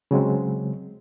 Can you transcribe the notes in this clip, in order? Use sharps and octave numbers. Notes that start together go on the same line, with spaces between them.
C#3 F#3 G#3 C4